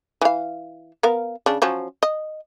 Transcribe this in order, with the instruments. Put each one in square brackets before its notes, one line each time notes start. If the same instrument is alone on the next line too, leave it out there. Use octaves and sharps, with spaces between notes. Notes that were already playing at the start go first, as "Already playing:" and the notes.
[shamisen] E3 F5
B3 A#4 F5
C#3 D4
F3 F#3 C#4
D#5